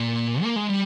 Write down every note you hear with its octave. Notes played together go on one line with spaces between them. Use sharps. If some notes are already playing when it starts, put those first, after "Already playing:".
Already playing: A#2
A#3
G#3
G3